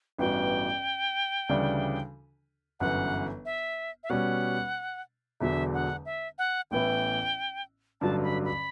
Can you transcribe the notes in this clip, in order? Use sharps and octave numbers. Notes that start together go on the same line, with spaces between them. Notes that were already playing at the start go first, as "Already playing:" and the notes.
A1 G2 E3 B3 F#4 G5
D2 C#3 E3 G3 D4
G1 F#2 E3 F#5
E5
E5
B2 G3 C#4 F#5
E1 E2 D3 F#3 E5
F#5
E5
F#5
A1 A2 E3 B3 E4 G5
A1 G2 D3 F#3 A5
B5
B5